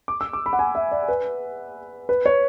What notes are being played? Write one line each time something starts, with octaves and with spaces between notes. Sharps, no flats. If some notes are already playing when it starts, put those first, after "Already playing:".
D6
E6
D6
B5
F#5
G#5
E5
D5
B4
B4
C#5